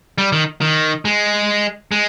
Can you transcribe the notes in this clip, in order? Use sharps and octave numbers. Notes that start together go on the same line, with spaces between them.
G3
D#3
D#3
G#3
G#3